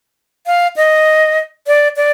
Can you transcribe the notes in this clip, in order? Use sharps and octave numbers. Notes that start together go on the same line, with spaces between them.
F5
D#5
D5
D5